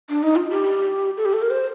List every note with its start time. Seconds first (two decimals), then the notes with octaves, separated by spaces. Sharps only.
0.10 D4
0.23 D#4
0.36 F4
0.50 G4
1.17 A4
1.25 G4
1.33 A4
1.42 A#4
1.50 C5